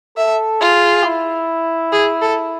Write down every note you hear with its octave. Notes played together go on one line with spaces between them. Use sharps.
A4 E5
F4 G#4
E4
G#4
A4